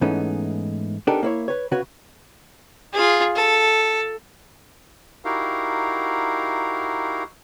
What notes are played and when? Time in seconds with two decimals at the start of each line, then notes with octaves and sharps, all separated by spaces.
0.01 G#2 E3 A3 B3 C#4 D#4
1.07 B3 D4 D#4 G4 A4 A#4
1.23 A#3 E4 C#5
1.48 B4 C#5
1.71 C#3 F#4 B4 C#5
2.94 F4 G#4
3.36 A4
5.25 D#4 E4 F#4 G4 A#4 F5